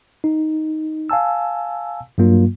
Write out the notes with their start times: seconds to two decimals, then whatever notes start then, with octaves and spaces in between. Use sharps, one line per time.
0.24 D#4
1.10 F5 G#5 A5 E6
2.18 G2 F#3 A#3 F4